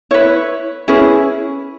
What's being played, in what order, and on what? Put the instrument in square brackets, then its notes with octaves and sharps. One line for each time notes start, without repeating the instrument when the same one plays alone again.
[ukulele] E4 B4 C#5
C#4 E4 G#4 B4